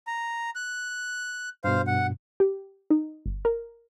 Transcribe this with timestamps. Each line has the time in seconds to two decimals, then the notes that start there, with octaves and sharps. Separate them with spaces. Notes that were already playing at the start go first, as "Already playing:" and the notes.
0.07 A#5
0.55 F#6
1.64 G2 B2 C5 F5
1.87 F#5
2.40 G4
2.90 D#4
3.26 G1
3.45 A#4